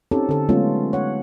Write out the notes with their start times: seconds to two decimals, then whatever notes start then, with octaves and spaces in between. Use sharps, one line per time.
0.11 C4 C#4 D#4 G4 A4
0.29 D3 A4
0.49 F#3 G#3 A3 B3 C#4 F4
0.93 C#5 F#5